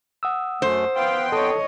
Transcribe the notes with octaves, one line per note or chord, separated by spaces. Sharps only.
F#5 D#6 E6
F#2 A3 C5
B3 F5 G5 C6
A4 C#5 D#5 A5 D#6